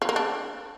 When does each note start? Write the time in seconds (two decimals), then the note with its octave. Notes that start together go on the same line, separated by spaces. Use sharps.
0.02 F3
0.09 A#3
0.16 D4